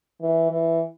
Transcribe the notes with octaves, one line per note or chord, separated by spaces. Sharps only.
E3
E3